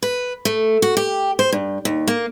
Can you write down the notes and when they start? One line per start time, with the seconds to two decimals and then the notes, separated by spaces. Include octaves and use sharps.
0.03 B4
0.45 A3
0.82 F#4
0.97 G4
1.39 C5
1.52 G2
1.85 D#2
2.08 A#3